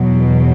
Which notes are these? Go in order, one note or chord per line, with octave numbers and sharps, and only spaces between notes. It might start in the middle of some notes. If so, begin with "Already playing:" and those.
Already playing: E2 B2 F#3